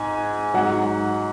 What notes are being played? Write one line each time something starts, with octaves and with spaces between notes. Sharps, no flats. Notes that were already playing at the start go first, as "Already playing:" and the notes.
Already playing: G#2 G#5
G#2 F#3 F#5